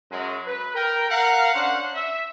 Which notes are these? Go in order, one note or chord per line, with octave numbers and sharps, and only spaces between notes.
F#2 F#3 G#3
B4
A#4 G5
A#4 F5 F#5
C#4 D4 C5 F#5
E5